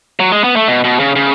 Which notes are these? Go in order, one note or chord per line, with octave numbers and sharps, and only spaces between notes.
F#3
G#3
B3
A3
B2
B2
C#3
C#3